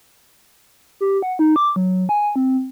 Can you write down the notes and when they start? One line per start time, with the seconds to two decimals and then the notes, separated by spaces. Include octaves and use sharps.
1.01 G4
1.22 F#5
1.39 D#4
1.56 D6
1.76 F#3
2.09 G#5
2.36 C4